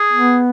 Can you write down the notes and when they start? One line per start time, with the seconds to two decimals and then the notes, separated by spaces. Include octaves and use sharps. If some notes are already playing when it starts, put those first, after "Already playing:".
Already playing: G#4
0.13 B3